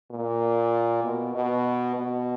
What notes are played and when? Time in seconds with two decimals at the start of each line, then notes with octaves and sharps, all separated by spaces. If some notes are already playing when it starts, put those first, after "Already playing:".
0.11 A#2
1.03 B2
1.35 B2
1.96 B2